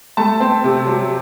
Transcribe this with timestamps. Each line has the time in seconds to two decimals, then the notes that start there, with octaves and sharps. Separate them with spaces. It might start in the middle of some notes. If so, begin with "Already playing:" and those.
0.17 A3 A5
0.40 C4
0.64 C3
0.87 F#3